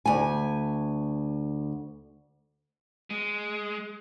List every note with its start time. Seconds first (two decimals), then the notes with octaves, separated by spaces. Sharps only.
0.06 D2 G#5
3.10 G#3